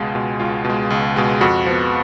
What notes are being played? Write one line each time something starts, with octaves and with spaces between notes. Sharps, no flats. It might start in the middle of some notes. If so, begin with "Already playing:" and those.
Already playing: C#2 B2 G#3 F4 G#4
B2 G#3
C#2 F4
B2 G#3
C#2
B2 G#3
F2 F#4
F3 B3